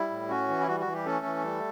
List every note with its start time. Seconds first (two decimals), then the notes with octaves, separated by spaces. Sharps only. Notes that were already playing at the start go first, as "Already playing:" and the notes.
Already playing: G3 E4
0.10 A2
0.29 C#4 F#4
0.48 E3
0.60 E4
0.67 G3 F#4
0.80 F#4
0.86 E3
0.93 G3 G4
1.05 A3 C#4 A4
1.25 E3
1.43 G3